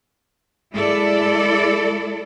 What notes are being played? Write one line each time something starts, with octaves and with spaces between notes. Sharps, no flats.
G#3 E4 A4 D5